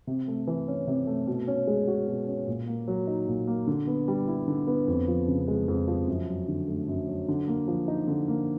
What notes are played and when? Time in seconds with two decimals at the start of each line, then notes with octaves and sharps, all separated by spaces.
0.07 C3
0.28 A3
0.47 E3
0.68 C#4
0.87 C3
1.07 A3
1.27 B2
1.48 C#4
1.67 G#3
1.88 F#4
2.08 B2
2.28 C#4
2.47 A#2
2.67 A#3
2.88 F#3
3.07 D#4
3.28 A#2
3.47 A#3
3.67 D3
3.87 B3
4.08 G3
4.28 E4
4.48 D3
4.67 B3
4.88 F2
5.08 F3
5.28 C#3
5.48 G#3
5.68 F2
5.88 F3
6.08 F#2
6.27 F#3
6.48 D3
6.68 A3
6.88 F#2
7.08 F#3
7.28 D3
7.48 A#3
7.68 F3
7.88 D#4
8.08 D3
8.28 A#3